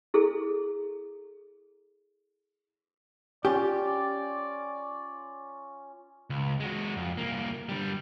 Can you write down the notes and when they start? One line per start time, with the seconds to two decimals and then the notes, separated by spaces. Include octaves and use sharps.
0.14 E4 G#4 A4
3.45 C#4 F4 G4 D5
6.30 C#2
6.60 G#3 F#4
6.97 F2
7.17 C2 A#3
7.69 D3 G3